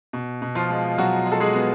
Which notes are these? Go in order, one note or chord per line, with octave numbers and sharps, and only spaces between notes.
B2
B2
F3 F4
G#3
B2 F#3 F#4
G#3
A4
G#3 G#4
B3